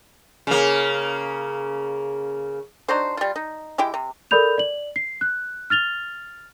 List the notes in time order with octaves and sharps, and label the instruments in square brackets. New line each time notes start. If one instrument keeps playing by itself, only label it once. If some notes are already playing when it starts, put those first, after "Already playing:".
[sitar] C#3 A#3
[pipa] D4 D#4 F#4 C5
G3 F4
D#4
G#3 E4 G4 G5
C3
[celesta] A4 A#4 D5 B5 G6 F7
D5 F#7
C7
F#6
F6 A6 F7 G7